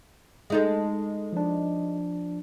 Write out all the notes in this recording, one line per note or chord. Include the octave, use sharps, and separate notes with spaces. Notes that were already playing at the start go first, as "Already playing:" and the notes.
G#3 D#4 A4
F3 D4